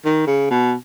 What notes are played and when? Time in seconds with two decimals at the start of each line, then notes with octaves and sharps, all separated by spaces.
0.05 D#3
0.27 C#3
0.50 B2